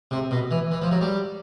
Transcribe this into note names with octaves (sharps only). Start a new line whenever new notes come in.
C3
B2
E3
E3
F3
F#3
G3